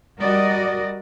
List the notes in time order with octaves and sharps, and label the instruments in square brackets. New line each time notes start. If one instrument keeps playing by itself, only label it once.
[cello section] G3 F#4 A#4 D5 D#5